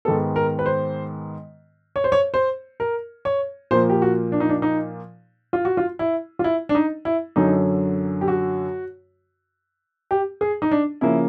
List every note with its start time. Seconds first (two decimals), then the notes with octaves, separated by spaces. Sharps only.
0.05 G#2 D#3 G#3 B3 A4
0.36 A#4
0.59 B4
0.66 C5
1.96 C#5
2.04 C5
2.12 C#5
2.34 C5
2.80 A#4
3.25 C#5
3.71 A#2 F3 A#3 C5
3.90 G4
4.02 F#4
4.32 D4
4.40 D#4
4.49 D4
4.62 D#4
5.53 F4
5.65 F#4
5.77 F4
5.99 E4
6.39 F4
6.44 E4
6.69 D4
6.75 D#4
7.05 E4
7.36 F#2 D3 F#3 D#4
8.21 G4
8.28 F#4
10.11 G4
10.41 G#4
10.62 D#4
10.71 D4
11.01 C#3 F3 A#3 E4